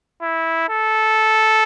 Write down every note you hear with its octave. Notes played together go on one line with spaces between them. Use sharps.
E4
A4